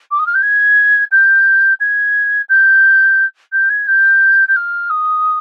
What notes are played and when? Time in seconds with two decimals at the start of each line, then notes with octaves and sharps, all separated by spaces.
0.11 D6
0.19 D#6
0.26 F6
0.34 G6
0.42 G#6
1.11 G6
1.80 G#6
2.49 G6
3.52 G6
3.69 G#6
3.87 G6
4.48 G6
4.56 F6
4.90 D#6